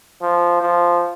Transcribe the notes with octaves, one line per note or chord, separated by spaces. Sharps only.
F3
F3